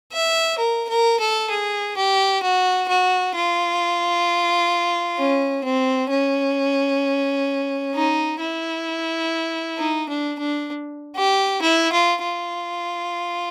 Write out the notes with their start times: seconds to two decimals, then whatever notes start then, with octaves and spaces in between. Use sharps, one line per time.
0.12 E5
0.58 A#4
0.89 A#4
1.20 A4
1.50 G#4
1.97 G4
2.42 F#4
2.88 F#4
3.35 F4
5.18 C#4
5.64 C4
6.10 C#4
7.94 D#4
8.40 E4
9.78 D#4
10.09 D4
10.39 D4
11.16 G4
11.62 E4
11.93 F4
12.23 F4